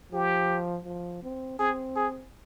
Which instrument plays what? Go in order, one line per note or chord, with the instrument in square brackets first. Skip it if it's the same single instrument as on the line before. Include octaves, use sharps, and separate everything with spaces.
[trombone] F3 [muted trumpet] G4
[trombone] F3
C4
[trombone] C4 [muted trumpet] G#4
[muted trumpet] G#4